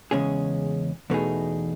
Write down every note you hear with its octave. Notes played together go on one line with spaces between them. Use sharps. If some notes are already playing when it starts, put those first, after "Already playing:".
E2 C#3 G#3 C#4 G#4
E2 B2 A3 D#4 G#4